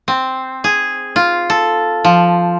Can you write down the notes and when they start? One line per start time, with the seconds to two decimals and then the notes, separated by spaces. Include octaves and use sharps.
0.08 C4
0.64 G#4
1.16 F4
1.50 A4
2.04 F3